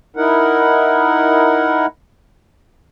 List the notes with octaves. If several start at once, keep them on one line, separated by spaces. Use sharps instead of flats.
D#4 E4 A#4 F#5